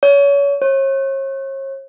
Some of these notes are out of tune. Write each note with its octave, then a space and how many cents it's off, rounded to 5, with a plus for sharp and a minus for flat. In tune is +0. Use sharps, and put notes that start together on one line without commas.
C#5 +30
C#5 -40